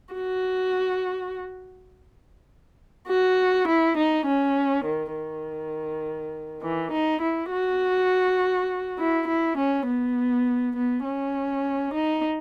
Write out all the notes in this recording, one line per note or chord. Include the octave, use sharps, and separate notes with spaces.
F#4
F#4
E4
D#4
C#4
D#3
D#3
E3
D#4
E4
F#4
E4
E4
C#4
B3
B3
C#4
D#4